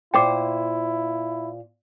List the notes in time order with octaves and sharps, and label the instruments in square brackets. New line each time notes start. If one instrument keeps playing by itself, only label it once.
[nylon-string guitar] A#2 C5 [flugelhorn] E4 [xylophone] G5 D6